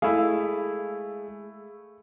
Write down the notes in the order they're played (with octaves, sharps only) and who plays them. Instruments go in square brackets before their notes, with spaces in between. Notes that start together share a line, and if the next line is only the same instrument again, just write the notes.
[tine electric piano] G#3 G#4 [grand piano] A3 [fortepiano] E4 F5